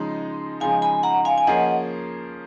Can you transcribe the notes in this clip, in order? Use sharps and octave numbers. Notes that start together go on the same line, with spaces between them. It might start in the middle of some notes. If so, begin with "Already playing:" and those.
Already playing: C#3 F3 G#3 D#4
C#3 F3 G#3 D#4 F5 G#5
G#5 B5
F#5 A#5
F5 G#5
G#5
F3 A#3 C#4 G#4 D#5 F#5